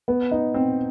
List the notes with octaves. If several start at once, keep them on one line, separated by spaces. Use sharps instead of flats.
B3
D#4
C4